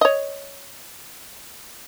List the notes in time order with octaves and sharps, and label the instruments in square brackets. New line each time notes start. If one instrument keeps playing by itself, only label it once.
[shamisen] C#5 D#5